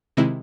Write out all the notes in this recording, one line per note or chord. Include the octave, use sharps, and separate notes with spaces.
C3 D#3 G#3 C4 E4